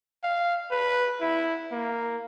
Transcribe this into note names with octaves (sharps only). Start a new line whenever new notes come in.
F5
B4
E4
A#3